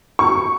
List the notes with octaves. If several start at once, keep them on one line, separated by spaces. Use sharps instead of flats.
C#6